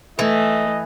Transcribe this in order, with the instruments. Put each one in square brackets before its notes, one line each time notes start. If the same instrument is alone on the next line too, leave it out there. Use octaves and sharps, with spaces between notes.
[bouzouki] E3 [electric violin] A3 [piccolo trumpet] D#5